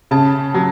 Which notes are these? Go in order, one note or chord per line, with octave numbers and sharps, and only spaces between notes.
C#3 A5
F#3